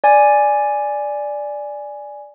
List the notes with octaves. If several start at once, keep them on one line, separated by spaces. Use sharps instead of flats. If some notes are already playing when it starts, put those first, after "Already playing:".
D5 G#5